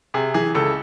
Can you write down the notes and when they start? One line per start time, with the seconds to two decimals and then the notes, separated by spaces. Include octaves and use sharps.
0.14 C3 G#4
0.34 E3 G#4
0.55 C#2 A4